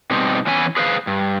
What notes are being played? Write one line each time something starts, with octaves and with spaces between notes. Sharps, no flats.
B2 G3 C4 D#4
E3 B3 C#4 E4 G#5
G#4 B4 C5 F5
G2